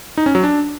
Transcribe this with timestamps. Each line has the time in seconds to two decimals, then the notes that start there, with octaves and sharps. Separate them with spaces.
0.17 D#4
0.26 C#4
0.35 F#3
0.43 D4